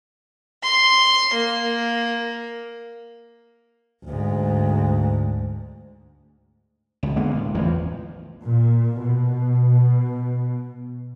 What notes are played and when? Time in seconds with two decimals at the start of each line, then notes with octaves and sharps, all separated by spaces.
0.62 C6
1.32 A#3
4.04 D2 G#2
7.03 C#2 B2
7.16 D3 G#3 A#3 B3
7.35 A2
7.54 F#1 E2 E3 F3
8.44 A#2
9.03 B2